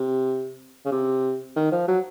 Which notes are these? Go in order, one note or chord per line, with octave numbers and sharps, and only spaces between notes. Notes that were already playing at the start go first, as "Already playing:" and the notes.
Already playing: C3
C#3
C3
D#3
F3
F#3